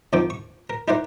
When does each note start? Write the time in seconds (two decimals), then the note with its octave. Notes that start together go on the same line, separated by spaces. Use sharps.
0.13 F#2 D#3 F3 C4 G5 D6
0.30 C#6
0.70 A#4
0.88 D#4 E4 A#4 C5 D5 F#5